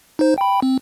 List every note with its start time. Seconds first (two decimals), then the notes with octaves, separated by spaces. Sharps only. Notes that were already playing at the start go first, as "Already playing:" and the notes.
0.19 D#4 C5
0.38 G5 B5
0.62 C4